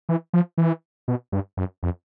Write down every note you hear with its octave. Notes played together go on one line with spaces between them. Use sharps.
E3
F3
E3
B2
G2
F#2
F2